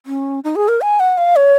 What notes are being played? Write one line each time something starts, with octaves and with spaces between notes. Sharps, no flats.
C#4
D#4
G#4
A#4
G#5
F#5
F5
C#5